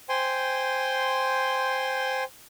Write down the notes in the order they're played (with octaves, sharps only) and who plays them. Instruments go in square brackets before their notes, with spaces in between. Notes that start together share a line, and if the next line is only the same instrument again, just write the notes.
[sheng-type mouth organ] C5 G5 G#5 C6